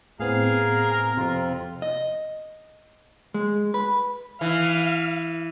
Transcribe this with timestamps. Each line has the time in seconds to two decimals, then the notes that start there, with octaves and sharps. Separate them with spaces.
0.20 A2 B3 C4 G#4 A#4 F5
1.17 F2 C3 F4 C6
1.82 D#5
3.34 G#3
3.74 B4
4.41 E3 F5